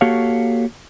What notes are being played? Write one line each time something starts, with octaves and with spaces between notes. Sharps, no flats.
A#3 F#4 G4 A4 C#5 F5